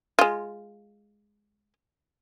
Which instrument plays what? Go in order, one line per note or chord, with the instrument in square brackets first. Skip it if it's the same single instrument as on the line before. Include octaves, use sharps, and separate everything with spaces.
[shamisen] G#3 F4